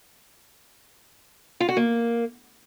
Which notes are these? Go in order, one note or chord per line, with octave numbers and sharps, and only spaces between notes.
F4
F#4
A#3